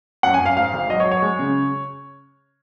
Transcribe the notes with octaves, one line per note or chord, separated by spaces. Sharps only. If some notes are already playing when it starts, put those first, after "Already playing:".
F#2 F#5
G#5
F#2
F5
G#2 F5
G#1
F#3 D#5
C#5
F#3
C#5
G#3
C#3